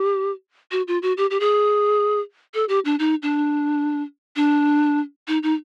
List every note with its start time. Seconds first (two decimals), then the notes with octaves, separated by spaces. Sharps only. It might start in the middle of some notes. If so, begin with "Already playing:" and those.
Already playing: G4
0.72 F#4
0.88 F4
1.02 F#4
1.17 G4
1.31 G4
1.40 G#4
2.54 A4
2.69 G4
2.85 D4
2.99 D#4
3.22 D4
4.36 D4
5.28 D#4
5.43 D#4